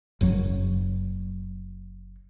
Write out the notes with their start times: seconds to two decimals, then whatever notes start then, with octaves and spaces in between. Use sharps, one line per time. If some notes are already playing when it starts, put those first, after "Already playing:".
0.21 F#1 F#2 F#3